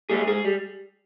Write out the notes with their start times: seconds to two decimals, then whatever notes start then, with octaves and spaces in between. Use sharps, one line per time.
0.10 A#2 G3 A#3 G#4
0.27 G#2 G#4
0.45 G3